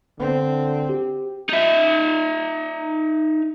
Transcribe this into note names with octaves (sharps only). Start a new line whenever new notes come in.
D3 C4
G4
D#4 E5